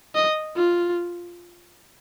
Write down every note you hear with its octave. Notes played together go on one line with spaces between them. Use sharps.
D#5
F4